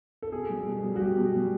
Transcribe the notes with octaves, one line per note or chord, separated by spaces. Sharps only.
A4
B2 G#4
G3
B2
G3
F#4
G3 G4
B2
G3